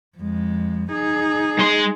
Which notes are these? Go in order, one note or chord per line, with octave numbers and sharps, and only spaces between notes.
F2 G#3
D#4 G#4
G#3 C6